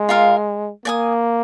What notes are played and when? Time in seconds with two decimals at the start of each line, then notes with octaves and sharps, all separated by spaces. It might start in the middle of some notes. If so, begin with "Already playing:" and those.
Already playing: G#3
0.09 F4 A#4 F5
0.85 A#3 D5 G#5 D#6